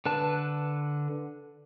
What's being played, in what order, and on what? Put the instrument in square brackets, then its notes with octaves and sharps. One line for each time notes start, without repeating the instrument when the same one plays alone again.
[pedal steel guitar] D3 B4 A5